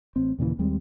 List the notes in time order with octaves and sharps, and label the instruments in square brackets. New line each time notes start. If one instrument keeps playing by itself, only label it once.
[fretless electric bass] A1 C4
D#2 A#2 C#3 E3
D#2 G3 G#3 C4